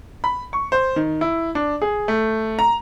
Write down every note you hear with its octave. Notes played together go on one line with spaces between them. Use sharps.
B5
C#6
C5
D#3
E4
D4
G#4
A3
A#5